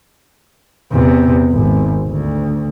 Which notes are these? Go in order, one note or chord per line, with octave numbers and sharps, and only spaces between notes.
E2 C3
G#1
D2